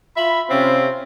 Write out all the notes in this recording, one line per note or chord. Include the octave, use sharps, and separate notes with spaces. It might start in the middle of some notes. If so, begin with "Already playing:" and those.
F4 E5 B5
C3 C4 C#4 F4